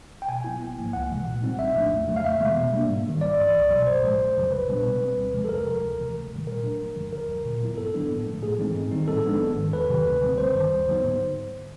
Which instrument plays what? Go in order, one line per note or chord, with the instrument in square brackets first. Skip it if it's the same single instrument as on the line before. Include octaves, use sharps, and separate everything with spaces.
[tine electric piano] G5
B2 G#5
F#3 B3 E4
G#1
G#2 F3 A#3
C#2 F#5
C3 E3 G#3
A#2
G3 C4 D#4
A#1 E5
A2 F3 A3 D4
E2
C#3 F#3 A3
F5
F2 E5
C3 E3 G#3 B3
B2
G3 A#3 D4
G#2
D#3 G3
A1 D5
G2 E3
C2
B2 F#3
A#1 C5
A2 F3 G#3
G1
F2 C#3 F#3
A#1 B4
A#2 G3 B3 D4
B2
G3 C4
D2
C3 F3 G#3
A4
F2 A#4
C3 F3
D2
C3 E3 A3
G#1
G#2 D#3 G3
A#2 A#4
F#3 A3 D4
G1
F#2 D3 F3 G#3
D#2 A#4
D3 F#3
A#2
F#3 B3 E4
G2 A4
D3 F#3 B3 D4
A2
F3 A3
A2 G#4
E3 G#3 C4 D#4
G#2
D#3 G3 C4 D#4
A2 A4
F3 G#3 B3 D4
G#1
G#2 D#3
E2 B4
C3 D#3 F#3
D2
D3 G3 C4
G#1 C5
G2 D#3 G3
D2
D3 F#3 B3 D#4
G#2